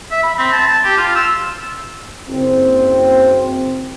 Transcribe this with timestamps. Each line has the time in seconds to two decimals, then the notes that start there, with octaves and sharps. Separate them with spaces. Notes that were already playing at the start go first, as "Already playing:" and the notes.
0.12 E5
0.23 B5
0.38 C4
0.53 A5
0.67 A5
0.85 G4
0.97 F4
1.15 E6
2.29 F#1 C4